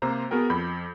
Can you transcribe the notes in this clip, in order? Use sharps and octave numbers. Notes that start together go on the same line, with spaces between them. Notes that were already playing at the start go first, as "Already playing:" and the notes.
C3 A#3 C5 A#5
B3 F#4 G#4 A#4 G5
F2 B5 G6